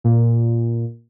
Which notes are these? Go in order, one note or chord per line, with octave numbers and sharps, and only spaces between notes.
A#2